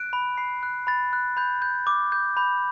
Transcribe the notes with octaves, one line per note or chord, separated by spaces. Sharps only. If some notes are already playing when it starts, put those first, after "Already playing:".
Already playing: F#6 D7
B5
B5 C7
F#6
B5 A6
F#6
B5 G6
G6
D6
G6
B5 G6